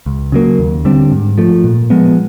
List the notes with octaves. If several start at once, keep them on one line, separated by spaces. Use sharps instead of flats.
C#2
C#3 F#3 A#3
D#2
D3 G3 C4
G#2
F3 A3
A#2
F3 G#3 B3